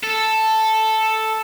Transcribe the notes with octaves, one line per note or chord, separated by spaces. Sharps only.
A4